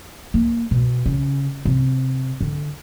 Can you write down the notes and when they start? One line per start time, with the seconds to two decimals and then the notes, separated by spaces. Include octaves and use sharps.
0.34 A#3
0.71 B2
1.06 C#3
1.65 C3
2.41 D3